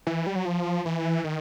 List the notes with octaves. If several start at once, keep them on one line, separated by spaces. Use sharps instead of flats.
E3
G3
F#3
F3
E3
D#3